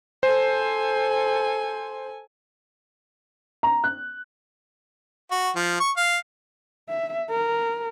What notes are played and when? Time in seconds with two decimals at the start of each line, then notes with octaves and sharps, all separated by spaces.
0.23 A4 C5 G#5
3.63 A#5
3.84 F#6
5.31 F#4
5.55 F3
5.80 C#6
5.97 F5
6.89 E5
7.30 A#4